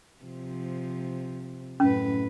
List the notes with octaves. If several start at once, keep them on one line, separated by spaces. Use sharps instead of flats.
C3 F3
F#2 A2 C#4 B4